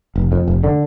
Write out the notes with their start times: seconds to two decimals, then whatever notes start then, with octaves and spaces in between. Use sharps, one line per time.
0.16 F1
0.32 F2
0.48 F1
0.64 D3